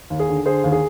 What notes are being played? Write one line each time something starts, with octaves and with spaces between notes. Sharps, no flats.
D#2
G#4
D3
D3 G#4 C5
D#2
G#4